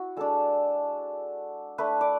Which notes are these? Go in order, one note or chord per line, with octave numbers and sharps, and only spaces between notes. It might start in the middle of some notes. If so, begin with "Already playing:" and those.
Already playing: E4 F#4
G#3 D4 A4
A3 D4 B4
D5